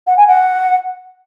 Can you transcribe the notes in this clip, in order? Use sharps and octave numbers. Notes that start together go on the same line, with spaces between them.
F#5
G#5
F#5